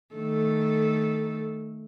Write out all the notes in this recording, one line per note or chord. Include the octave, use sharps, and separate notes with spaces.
D#3 A3 A4